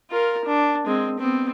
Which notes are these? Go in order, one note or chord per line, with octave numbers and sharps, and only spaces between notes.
F4 A#4
D4
G#3 C4
B3 C4